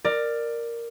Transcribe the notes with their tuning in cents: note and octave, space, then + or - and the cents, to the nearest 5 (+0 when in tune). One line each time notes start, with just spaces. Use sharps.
A#4 +0 D5 +15